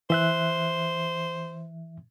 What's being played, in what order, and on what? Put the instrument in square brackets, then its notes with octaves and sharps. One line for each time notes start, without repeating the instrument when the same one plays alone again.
[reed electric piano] E3 E5 F#6 [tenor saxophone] C5